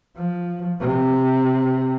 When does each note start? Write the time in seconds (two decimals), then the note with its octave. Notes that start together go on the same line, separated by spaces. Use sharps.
0.16 F3
0.80 C3